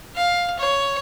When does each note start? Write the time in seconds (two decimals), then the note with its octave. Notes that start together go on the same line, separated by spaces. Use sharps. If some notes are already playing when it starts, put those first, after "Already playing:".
0.16 F5
0.59 C#5